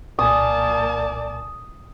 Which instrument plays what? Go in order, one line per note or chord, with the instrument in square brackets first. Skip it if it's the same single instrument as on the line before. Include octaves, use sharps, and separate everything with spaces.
[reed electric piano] C2 A#2 G#5 [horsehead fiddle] A#3 A5 [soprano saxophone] D5 [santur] D#6